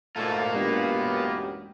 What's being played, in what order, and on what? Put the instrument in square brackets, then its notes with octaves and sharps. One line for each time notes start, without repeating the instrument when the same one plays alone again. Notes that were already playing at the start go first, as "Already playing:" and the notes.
[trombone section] D2 G#2 A3 [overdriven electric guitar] A#3 F4 [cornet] A4
[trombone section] A1 F#2 G4 [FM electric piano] G#3 D4 [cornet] B3